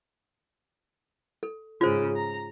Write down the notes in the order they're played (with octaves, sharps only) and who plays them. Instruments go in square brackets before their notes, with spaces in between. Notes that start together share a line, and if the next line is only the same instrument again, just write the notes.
[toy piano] A4
[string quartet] G#2 C#3 [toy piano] F4 C5
[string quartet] A#5